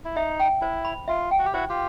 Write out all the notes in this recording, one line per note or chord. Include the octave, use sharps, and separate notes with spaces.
E4
D#4 E5
G5
E4 C5
B5
F4 E5
G5
F#4
G4
E4 F#4 C5
F4 G4